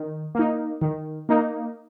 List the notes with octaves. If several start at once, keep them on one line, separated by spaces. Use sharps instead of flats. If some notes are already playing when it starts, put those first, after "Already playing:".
Already playing: D#3
A#3 D#4
D#3
A#3 D#4